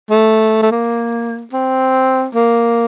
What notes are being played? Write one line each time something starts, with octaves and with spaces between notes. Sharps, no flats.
A3
A3
A#3
C4
A#3